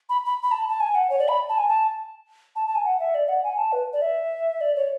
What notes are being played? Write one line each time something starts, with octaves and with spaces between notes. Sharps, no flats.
B5
B5
B5
A5
A5
G#5
F#5
C#5
D5
B5
A5
G#5
A5
A5
A5
G#5
F#5
E5
D5
F#5
G#5
A5
B4
D5
E5
D5
C#5